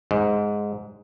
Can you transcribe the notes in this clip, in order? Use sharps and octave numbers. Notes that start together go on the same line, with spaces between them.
G#2